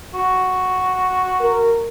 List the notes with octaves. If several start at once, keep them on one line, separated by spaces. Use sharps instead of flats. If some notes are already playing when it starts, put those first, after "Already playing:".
F#4
A#4